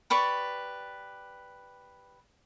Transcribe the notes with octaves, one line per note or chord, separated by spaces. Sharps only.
G4 B4 D5 C#6